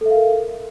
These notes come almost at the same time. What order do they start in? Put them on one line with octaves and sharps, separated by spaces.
A4 E5 F5 A#4